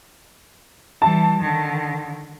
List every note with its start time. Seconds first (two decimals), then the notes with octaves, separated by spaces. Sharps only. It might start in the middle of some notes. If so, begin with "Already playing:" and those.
1.02 E3 G3 A5
1.41 D3 D#3